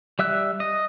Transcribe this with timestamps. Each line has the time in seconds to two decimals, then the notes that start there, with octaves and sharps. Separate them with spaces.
0.19 G3 E5 E6 F#6
0.60 D#5